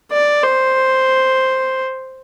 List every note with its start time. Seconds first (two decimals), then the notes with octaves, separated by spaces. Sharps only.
0.12 D5
0.43 C5